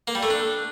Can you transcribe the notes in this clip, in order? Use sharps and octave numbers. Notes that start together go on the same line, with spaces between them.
A#3
G3
A3
D4